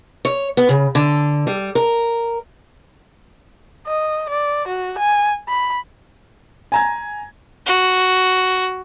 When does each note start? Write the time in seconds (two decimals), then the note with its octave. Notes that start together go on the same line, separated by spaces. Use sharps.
0.25 C#5
0.57 B3
0.69 C#3
0.95 D3
1.47 G3
1.75 A#4
3.87 D#5
4.29 D5
4.68 F#4
4.98 G#5
5.49 B5
6.72 G#5 A#5 G#6
7.66 F#4